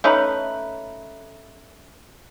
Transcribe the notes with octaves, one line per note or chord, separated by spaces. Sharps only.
A3 C#4 D#4 B4